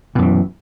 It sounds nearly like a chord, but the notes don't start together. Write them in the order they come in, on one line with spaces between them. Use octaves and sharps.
B2 F#2 E3